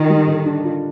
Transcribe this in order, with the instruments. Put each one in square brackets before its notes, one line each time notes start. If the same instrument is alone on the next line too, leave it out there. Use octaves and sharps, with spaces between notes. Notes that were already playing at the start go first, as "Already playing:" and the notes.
Already playing: [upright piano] D3 D4 F4 [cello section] D#3
[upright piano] G3
D3
D4
F4